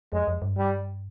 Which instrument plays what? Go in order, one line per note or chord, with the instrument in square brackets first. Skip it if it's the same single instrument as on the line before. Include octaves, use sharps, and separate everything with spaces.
[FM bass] F2 [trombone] G#3
[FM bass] F2
G2
[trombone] G3